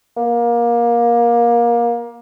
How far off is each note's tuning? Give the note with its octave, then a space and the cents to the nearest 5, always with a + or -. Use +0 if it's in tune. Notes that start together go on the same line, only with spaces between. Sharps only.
A#3 +20